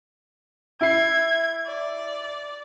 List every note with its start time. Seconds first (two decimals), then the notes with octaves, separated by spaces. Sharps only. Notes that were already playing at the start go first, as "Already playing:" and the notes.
0.81 E4 G#6 C7
1.66 D5